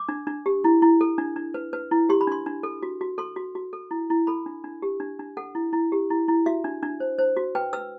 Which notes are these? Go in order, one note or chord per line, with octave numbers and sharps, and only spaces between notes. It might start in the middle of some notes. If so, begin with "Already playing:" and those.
Already playing: D6
D4
D4
G4
E4
E4
A4
D4
D4
B4
B4
E4
G4 C6
B5
D4 C6
D4
A4
F#4
F#4
A4 C6
F#4
F#4
A4
E4
E4
A4 B5
D4
D4
G4
D4
D4
A4 F#5
E4
E4
G4
E4
E4
F#4 E5
D4
D4
C5
C5
F#4
B4 G5
B4 E6